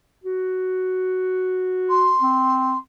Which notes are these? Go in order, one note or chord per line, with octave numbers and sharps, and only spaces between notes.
F#4
C6
C4